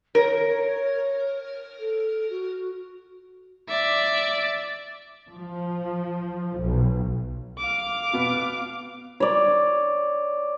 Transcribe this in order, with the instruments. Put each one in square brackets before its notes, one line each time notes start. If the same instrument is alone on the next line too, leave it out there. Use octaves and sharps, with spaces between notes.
[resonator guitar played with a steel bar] A#4 [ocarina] C#5
[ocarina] A4
F#4
[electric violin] D5 E5
[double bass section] F3
B1
[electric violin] F5 D6
[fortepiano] B2 B3
[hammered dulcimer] C#5 D5